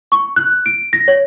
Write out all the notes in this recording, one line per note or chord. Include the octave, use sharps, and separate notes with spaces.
C#6
F#6
D7
A#6
C#5